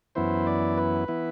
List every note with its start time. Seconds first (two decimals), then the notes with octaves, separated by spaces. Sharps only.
0.15 F#2 E3 B3 E4 C5
0.47 D5
0.78 B4
1.08 E3 B3 E4